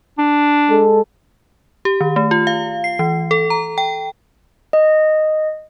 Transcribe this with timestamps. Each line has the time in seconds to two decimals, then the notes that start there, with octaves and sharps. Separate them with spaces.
0.18 D4
0.69 G#3 A4
1.85 G4
2.01 D#3
2.16 A3
2.31 F4
2.47 F5
2.84 C7
2.99 E3
3.31 A4
3.50 A#5
3.78 G5
4.73 D#5